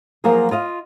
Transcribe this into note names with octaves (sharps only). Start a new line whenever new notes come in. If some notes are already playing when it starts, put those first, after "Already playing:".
F3 F#3 A#3 F4 G#4
F4 D#5 F5